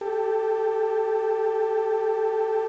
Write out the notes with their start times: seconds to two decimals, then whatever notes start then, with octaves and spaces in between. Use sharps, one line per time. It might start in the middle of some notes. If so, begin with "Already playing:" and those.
0.01 G4 A4